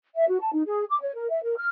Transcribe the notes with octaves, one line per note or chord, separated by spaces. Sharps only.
E5
F#4
A5
D#4
G#4
D6
C#5
A#4
E5
A#4
F6